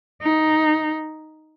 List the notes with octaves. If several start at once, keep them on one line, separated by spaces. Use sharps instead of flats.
D#4